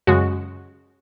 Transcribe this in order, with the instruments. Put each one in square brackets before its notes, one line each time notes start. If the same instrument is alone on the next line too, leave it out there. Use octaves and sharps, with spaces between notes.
[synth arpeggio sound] F#2 C#3 G#3 F#4